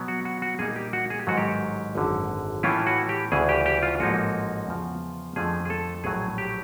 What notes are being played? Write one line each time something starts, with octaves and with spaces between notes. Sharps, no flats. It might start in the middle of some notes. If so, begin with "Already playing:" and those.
Already playing: B2 F#3 B3
F#4
F#4
F#4
A#2 G3 A#3 D#4 G#4
G4
F#4
G#4
G4
A1 G#2 D#3 F#3 F#4
G4
G#1 F#2 D3
A2 E3 A3 C#4 E4 F4
F#4
G4
D2 C#3 E3 G#4
G4
G4
F4
A1 G#2 F3 A#3 D#4 F#4
E2 C#3 F3
F2 D3 F3 A3 G#4
G#4
A4
A#1 A2 F#3 A3 G#4
G4